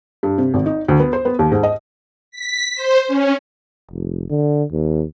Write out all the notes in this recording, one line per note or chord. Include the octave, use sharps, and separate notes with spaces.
G2
C3
G#1
D#4
D2
B3
C5
B3
D#2
G#2
D#5
B6
C5
C#4
F1
D3
D#2